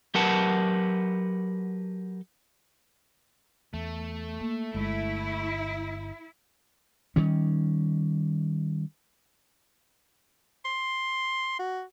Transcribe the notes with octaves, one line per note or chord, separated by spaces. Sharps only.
F#3 G4 A#4 B4 F#5 A5
E2 A3
A#3
G1 G#3 E4
D#3 G3 C#4
C6
F#4